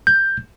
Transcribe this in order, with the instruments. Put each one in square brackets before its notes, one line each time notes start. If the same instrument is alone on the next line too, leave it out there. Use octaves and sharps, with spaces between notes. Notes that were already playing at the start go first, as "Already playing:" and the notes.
[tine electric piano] G6